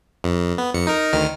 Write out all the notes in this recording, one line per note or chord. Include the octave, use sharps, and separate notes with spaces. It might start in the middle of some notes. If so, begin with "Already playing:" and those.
F2
B3
F2 C#7
D#4 A#4
D2 D#3 F6